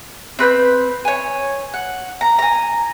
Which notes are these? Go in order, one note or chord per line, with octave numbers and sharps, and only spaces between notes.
C4 B4 B5 G6
C#5 G#5
F#5
A#5
G#5 A#5